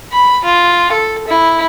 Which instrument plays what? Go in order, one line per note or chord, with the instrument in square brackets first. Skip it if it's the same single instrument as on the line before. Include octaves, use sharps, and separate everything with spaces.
[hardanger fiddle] B5
F4
A4
E4